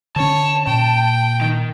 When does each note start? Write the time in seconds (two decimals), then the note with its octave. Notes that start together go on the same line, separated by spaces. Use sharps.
0.16 D3 C#4 C#5 A5
0.67 A#2 G5
1.41 D#3 D#4